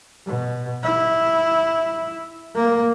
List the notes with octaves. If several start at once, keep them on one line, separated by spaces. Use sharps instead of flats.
B2
E4
A#3